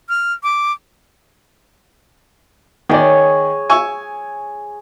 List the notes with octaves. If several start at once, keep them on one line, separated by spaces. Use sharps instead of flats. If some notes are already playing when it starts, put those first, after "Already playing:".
F6
D6
D#3 G#4 C#5 D5
G#5 C#6 E6